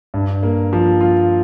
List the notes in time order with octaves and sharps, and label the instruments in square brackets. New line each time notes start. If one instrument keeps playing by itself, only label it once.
[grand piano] G2
A#3
F3
F4